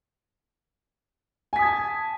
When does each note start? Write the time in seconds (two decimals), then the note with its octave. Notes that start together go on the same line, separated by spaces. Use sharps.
1.53 G#5
1.56 B6
1.59 D#6
1.62 G#6
1.65 A5